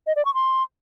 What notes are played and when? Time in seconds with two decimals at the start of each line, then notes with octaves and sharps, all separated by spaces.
0.07 D#5
0.16 D5
0.25 C#6
0.34 C6